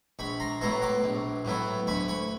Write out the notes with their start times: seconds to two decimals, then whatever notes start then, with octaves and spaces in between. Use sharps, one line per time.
0.19 A#1 B5 C#6
0.40 A#5 C6
0.61 A2 F#3 B3 E4 A#5 C6
0.82 C6 D6
1.04 A#1
1.45 A2 F#3 B3 E4
1.87 D2 B5 C#6
2.08 B5 C#6